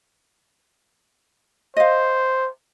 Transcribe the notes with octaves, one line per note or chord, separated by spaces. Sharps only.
C5 D#5 F5